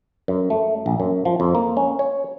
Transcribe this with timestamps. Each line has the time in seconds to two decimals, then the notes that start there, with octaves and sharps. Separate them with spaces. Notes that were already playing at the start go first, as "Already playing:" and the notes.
0.28 F#2
0.50 A3
0.86 A#1
1.00 F#2
1.25 F3
1.40 F2
1.55 A#3
1.77 C#4
1.99 C#5